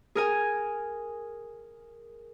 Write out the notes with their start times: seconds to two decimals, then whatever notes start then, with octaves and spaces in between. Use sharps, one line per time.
0.15 G#4 A#4 G#5